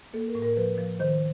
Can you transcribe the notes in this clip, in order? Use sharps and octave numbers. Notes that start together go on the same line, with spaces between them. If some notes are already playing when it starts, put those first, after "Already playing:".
A#3 A4
A#4
A2
A#4
F3 B4
F3
D#3 C5